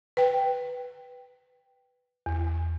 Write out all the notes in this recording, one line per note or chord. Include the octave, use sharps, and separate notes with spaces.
B4 G5
E2